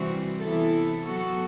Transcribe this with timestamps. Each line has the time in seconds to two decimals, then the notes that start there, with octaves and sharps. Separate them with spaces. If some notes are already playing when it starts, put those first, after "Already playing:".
Already playing: C3 E3 G3 C4 F#4
0.41 C3 E3 B3 E4 A4
1.02 F#3 B3 F#4 A4